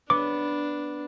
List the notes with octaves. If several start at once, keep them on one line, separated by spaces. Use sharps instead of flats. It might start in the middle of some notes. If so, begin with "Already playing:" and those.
B3 D4 D6